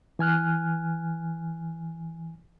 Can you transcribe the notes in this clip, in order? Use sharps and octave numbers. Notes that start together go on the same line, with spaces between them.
E3 G#5 F6 F#6